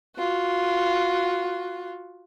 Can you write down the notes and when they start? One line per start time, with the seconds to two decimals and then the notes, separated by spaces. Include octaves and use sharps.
0.17 F4 F#4